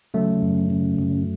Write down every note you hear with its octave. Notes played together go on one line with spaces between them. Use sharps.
C#3 F#3 A3
F#2
C#3
F#2